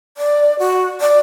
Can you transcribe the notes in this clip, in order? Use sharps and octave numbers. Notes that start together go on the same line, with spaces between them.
D5
F#4
D5